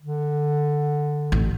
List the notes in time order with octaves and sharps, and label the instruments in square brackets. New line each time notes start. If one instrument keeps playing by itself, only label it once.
[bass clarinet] D3
[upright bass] A1